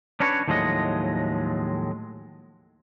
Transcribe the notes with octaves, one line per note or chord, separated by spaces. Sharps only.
C#4 D4 F#4 B4 C#5
D#2 A2 F3 F#3 G#3 D#5